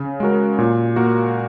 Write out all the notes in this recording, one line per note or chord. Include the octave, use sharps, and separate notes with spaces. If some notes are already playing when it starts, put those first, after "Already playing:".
Already playing: C#3
G#3 F#4 A#4
A#2
A#3 F#4 A#4